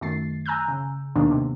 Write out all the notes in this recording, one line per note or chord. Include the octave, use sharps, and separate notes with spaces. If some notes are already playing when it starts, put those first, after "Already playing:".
F#2 D#3 A3 A6 C7
G#5 A#5 E6 F#6 G6
C#3
D#2 G#2 B2 D#3 A#3 D4
C3